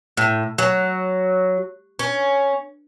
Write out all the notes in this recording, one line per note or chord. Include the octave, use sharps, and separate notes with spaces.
A2
F#3
C#4